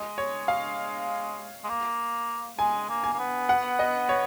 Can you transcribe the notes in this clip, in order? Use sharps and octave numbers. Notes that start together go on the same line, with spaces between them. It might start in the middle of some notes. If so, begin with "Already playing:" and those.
Already playing: G#3 D#5
C#5
F5
G#3
A#3
G#3 G#5
A#3
G#5
A#3
B3
F#5
D#5
C#5